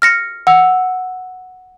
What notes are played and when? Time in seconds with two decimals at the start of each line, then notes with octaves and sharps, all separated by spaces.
0.02 F6 A#6 C#7
0.47 F#5 E6